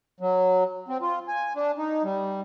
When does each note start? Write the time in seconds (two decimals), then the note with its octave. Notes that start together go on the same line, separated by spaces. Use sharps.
0.20 F#3
0.88 C4
1.02 F4
1.28 G#5
1.56 D4
1.78 D#4
2.04 G3